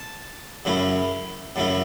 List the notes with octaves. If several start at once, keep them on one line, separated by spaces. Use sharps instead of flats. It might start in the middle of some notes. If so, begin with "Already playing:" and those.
Already playing: A5
F#2 C#3 F#3 C#4 E4
F#2 C#3 F#3 C#4 E4